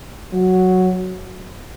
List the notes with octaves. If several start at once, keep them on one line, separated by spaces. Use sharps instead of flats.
F#3